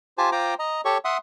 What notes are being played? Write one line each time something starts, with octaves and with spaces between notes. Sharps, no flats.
F4 G4 C5 G#5 A5
F4 C5 G5 A#5 D6
D#5 A#5
G4 A4 C#5 C#6
E5 F#5 C6 D#6